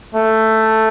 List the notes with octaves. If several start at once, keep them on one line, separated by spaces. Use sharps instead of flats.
A3